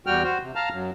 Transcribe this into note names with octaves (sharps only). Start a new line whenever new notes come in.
E2 G3 F#4 G5 F6
F#4 C5
C3
F5 A5 A#5 F6
F#2 F#3